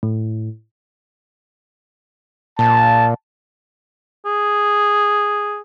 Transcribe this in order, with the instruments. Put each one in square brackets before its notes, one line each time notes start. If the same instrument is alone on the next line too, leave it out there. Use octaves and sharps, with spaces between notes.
[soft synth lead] A2
[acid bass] A#2 [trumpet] A5
[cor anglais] G#4